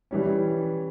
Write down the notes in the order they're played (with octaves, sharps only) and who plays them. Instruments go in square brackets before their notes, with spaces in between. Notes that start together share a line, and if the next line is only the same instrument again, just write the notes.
[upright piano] E3 G3 C#4